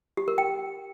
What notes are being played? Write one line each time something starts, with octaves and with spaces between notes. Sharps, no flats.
G4
A#4
G5